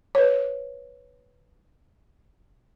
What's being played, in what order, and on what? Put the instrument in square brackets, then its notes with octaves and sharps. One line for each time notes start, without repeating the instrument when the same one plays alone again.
[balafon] B4 C#5